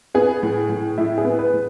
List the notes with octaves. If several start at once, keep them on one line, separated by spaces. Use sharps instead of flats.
B3 G#4
A2
A2
A2 E4
G#4
B3
B4
A2